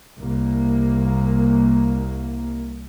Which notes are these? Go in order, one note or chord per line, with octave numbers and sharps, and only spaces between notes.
C2 A#3